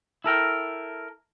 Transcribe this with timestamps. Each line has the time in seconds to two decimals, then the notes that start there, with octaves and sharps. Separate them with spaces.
0.24 E4 A4 A#4 G5